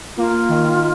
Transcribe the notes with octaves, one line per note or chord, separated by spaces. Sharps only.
A#3 F4
D#3